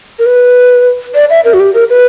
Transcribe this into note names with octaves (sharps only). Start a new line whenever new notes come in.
A#4
B4
D5
E5
A#4
F#4
G4
A#4
B4